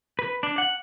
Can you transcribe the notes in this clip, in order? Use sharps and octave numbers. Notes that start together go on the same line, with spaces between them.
B4
D4
F#5